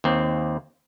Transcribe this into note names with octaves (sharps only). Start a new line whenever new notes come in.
D#2 C4